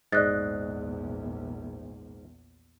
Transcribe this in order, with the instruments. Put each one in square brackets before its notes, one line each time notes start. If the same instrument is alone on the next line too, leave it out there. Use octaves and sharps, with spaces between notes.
[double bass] A#1 E2 [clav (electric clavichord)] G#2 D#5 [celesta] D5 F#6 A6